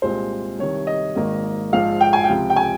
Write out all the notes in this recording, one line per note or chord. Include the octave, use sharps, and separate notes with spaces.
C2 A#2 G#3 C4 C5
C2 C3 D#3 C#5
D#5
G#1 G#2 D#3 A#3
A#1 G#2 F3 F5
G5
G#5
G5
C#2 C3 F3
G5
G#5